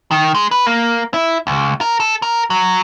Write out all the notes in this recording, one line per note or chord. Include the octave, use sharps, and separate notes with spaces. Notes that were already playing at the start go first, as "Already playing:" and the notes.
D#3
G#3
B4
A#3
E4
C#2
A#4
A4
A#4
F#3